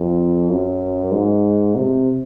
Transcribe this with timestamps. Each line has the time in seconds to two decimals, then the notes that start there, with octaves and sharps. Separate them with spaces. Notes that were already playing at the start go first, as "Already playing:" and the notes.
Already playing: F2
0.49 F#2
1.12 G#2
1.75 C3